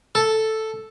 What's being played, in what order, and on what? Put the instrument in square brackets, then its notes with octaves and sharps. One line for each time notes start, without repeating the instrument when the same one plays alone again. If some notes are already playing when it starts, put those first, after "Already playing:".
[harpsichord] A4